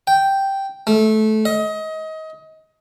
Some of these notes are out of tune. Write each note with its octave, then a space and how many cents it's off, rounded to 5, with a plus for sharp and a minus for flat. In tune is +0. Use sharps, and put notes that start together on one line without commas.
G5 -5
A3 -20
D#5 +25